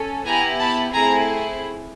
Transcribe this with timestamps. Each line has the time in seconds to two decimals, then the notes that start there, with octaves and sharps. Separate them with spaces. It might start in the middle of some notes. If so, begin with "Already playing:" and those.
Already playing: C#4 A4
0.26 B3 E4 G4 G#5 A#5
0.60 A5 B5
0.93 A3 C4 E4 G#4 G#5 A#5